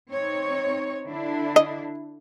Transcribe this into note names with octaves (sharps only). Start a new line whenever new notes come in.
C4 D#4 C#5
D3 D4 E4
D#5